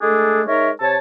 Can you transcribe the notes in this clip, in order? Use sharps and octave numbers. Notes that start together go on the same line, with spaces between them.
G#3 A3 D4 G#4 A4
G#3 D#4 A#4 C#5 E5
C3 C#5 A5